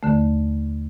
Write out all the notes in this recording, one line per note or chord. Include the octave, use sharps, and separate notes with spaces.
D#2 D3 A3